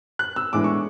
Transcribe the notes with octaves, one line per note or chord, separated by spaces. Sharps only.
F#6
E6
A2 E3 G#3 B3 D4 D6
C#6